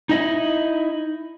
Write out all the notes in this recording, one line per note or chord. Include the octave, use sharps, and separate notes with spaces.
D#4 E4 D#5